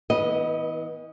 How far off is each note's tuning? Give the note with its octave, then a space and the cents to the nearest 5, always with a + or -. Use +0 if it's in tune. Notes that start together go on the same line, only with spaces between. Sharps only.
E3 -40 B3 -10 D#5 +0